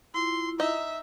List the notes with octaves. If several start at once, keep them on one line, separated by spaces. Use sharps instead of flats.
E4 F4 C6
D#4 E5